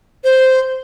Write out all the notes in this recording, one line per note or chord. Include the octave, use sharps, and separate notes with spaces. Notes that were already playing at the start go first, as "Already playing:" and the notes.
C5